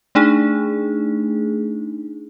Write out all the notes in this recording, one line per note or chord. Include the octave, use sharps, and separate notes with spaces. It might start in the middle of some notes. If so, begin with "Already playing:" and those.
A3 D4 D#4 G#4